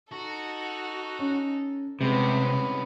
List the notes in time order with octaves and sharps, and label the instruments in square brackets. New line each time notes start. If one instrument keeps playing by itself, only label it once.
[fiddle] D#4 A4 [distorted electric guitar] F#4
[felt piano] C#4
[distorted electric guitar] C2 C#4 [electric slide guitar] C3 [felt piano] G#3 [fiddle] B3